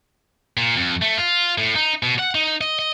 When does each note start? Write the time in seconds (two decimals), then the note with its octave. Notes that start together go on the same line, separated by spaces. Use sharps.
0.57 A#2
0.77 F2
1.02 A3
1.17 F4
1.58 A2
1.75 D#4
2.03 B2
2.19 F#5
2.35 D#4
2.61 D#5
2.79 D#5